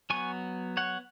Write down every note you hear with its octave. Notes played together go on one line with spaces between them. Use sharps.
F#3 B3 G#5 C#6
C#5 F#5